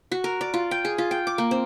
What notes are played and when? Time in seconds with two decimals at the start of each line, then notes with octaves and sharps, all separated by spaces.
0.12 F#4
0.24 A#4
0.41 D5
0.54 F4
0.71 G5
0.85 G#4
0.98 F4
1.11 G5
1.27 D6
1.38 A#3
1.51 C4